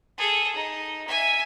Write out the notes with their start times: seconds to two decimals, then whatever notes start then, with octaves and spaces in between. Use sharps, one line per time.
0.18 G#4 A4
0.55 D#4
1.07 E5 G#5